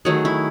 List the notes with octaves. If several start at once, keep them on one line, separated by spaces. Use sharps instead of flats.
D#3 F#3 A3 G#4
E4